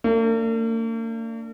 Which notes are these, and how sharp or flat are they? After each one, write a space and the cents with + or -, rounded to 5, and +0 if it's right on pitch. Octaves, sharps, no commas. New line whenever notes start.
A#3 -45 D4 +0